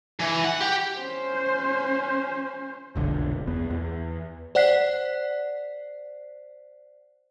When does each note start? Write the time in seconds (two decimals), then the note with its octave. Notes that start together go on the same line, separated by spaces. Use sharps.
0.20 E3
0.45 F#5
0.61 G4
0.99 C#4 C5
2.96 F1 B1 D3
3.47 E2 B3
3.70 E2
4.55 C5 D5 F#5 F#6 B6 C7